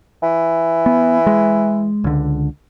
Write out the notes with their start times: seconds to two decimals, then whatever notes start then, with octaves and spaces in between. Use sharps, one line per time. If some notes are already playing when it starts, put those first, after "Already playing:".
0.23 E3
0.86 B3
1.27 G#3
2.04 C#2 D3